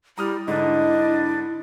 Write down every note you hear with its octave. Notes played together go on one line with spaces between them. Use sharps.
G3 E4 A#5 D#6 F6
G#2 D3 D4 D#5